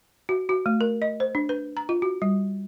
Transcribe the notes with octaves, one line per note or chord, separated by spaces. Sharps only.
F#4
F#4
A3
A#4
D#5
C5
D4
B4
A#5
F4
F#4
G3